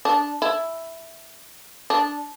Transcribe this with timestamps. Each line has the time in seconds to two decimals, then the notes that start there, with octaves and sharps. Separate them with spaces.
0.05 D4
0.42 E4
1.90 D4